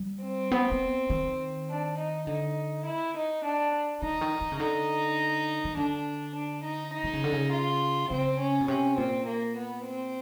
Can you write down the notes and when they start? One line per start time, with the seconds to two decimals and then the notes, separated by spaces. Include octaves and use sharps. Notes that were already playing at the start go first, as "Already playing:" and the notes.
Already playing: G3
0.23 C4
0.51 B3
0.72 B3
1.10 D#3
1.69 D4
1.98 D#4
2.27 D3 D#4
2.85 E4
3.15 D#4
3.44 D4
4.02 D3 D#4
4.21 D#3
4.41 D#3
4.52 C#3
4.60 D3 D#4
5.65 D#3
5.77 D3 D4
6.35 D4
6.64 D#4
6.93 D#4
7.04 D3
7.13 C#3
7.24 D3
7.32 C#3
7.52 F4
8.10 C#3 C4
8.39 C#4
8.61 B2
8.68 C3 C#4
8.98 A#2 C4
9.27 A#3
9.56 B3
9.85 C4